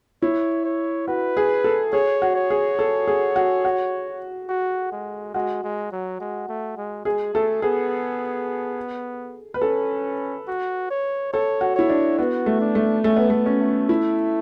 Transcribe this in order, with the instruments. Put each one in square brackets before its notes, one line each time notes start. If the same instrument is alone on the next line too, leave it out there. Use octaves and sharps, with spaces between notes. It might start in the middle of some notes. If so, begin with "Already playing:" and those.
[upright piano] E4 [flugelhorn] C#5
[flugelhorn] C#5
[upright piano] F#4 [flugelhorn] B4
[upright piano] G#4
A4
[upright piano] G#4 [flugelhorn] C#5
[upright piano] F#4
[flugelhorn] C#5
[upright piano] G#4
A4
G#4
F#4
F#4
[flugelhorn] F#4
G#3
[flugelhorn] G#3 [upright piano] F#4
[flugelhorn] G#3
F#3
G#3
A3
G#3
[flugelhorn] G#3 [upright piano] G#4
[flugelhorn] A3 [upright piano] A4
[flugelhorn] B3 [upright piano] G#4
[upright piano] B4
[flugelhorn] C#4 [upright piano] A4
[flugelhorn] F#4
C#5
[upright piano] A4 [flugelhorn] C#5
[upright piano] F#4
[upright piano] E4 [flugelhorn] C#5
[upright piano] D4
[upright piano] B3 [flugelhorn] F#4
[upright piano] A3
[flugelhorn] D4
[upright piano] A3
[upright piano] A3 [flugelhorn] C#4
[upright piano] B3
A3
C#4
[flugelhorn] A3
[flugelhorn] A3 [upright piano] E4